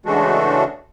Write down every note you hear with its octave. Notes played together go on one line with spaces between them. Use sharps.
C#3 E3 G#3 A3 D4 F#4